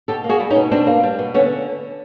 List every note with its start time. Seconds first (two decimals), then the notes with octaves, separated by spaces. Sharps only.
0.08 B2 G4 A4
0.24 A#3
0.29 F#4 G#4
0.40 G3
0.50 C#4 D#4
0.56 B2
0.71 B2 C4 D4
0.87 A#3
1.03 G3
1.19 B2
1.34 D3 B3 C#4